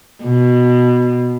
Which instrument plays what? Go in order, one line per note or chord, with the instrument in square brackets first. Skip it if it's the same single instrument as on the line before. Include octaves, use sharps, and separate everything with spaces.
[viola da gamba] B2